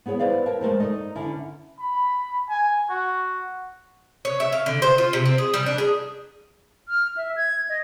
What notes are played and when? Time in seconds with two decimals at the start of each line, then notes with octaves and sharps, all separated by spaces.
0.06 B3 E4 G#4 C#5
0.19 E4 B4 C5 D5 F5
0.46 A#4 C#5 E5 G5 A5
0.61 G#3 A3 A#4 C5
0.80 D#4 A4 D5 D#5
1.15 D3 C#4 E4
1.79 B5
2.50 G#5
2.90 F#4
4.25 C#5
4.40 E5
4.52 F5
4.66 D3
4.82 C5
4.98 F4
5.13 C3
5.25 C4
5.38 G#4
5.54 G3
5.66 D4
5.78 G#4
6.89 F6
7.17 E5
7.37 G#6
7.69 D#5